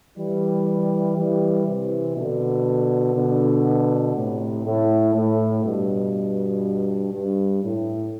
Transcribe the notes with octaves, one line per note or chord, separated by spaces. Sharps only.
E3 G3
E3 G3
C3 E3
B2 D3
B2 D3
A2 C3
A2
A2
G2 B2
G2
A2